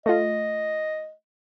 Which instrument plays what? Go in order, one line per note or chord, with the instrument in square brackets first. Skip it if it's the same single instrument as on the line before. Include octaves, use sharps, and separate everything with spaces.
[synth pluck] A3 F4 [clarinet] D#5